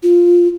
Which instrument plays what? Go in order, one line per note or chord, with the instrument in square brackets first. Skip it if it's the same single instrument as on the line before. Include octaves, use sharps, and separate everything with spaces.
[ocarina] F4